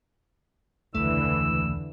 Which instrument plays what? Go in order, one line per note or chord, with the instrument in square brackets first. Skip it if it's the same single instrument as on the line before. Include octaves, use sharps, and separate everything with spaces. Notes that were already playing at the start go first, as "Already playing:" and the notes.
[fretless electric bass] E1 C#2 [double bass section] D3 E3 [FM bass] A3 [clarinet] E6